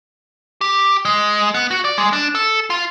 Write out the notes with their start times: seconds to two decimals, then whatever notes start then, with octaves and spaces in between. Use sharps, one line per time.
0.61 G4
1.05 G#3
1.54 B3
1.71 F#4
1.85 D5
1.98 G#3
2.13 D4
2.35 A4
2.70 F4